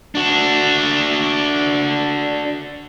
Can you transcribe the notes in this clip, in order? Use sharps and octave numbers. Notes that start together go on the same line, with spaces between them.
D4 F#4